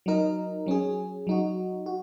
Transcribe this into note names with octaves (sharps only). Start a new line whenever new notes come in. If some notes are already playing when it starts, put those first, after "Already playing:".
F#3 D#4 A#4
F#3 C#4 G#4
F#3 D#4 F#4
F#4